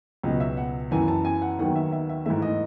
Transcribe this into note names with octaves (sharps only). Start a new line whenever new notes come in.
C#2 B2 F#3 B3 D#5
E5
F#5
F#2 E3 B3 G#5
A5
G#5
F#5
D#2 D#3 F#3 B3 F#5
E5
E5
E5
G#2 E3 A3 E5
D#5